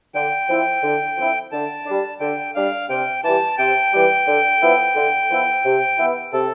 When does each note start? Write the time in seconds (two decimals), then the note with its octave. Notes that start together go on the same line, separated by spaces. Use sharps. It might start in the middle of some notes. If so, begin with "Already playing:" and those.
0.14 D3 G5
0.49 F3 C4 E4
0.83 D3
1.18 F3 C4 E4
1.52 D3 A5
1.86 G3 D4
2.20 D3 G5
2.55 G3 D4 F5
2.89 C3 G5
3.24 E3 G3 A5
3.58 C3 G5
3.93 E3 G3
4.27 D3
4.61 F3 B3 E4
4.95 D3
5.30 F3 B3 E4
5.65 C3
5.99 E3 B3 E4
6.33 C3 A4